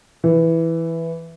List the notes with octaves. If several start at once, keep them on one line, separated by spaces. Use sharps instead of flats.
E3